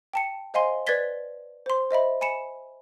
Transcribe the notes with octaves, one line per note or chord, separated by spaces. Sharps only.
G5 A5 C#7
C5 D#5 F5 G#5 C6
B4 D5 G#6 A6 B6 G7
C5 C6
C5 D#5 E5 B5
G#5 B5 C#7 E7